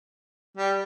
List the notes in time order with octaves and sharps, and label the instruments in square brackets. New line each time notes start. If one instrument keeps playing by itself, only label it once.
[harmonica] G3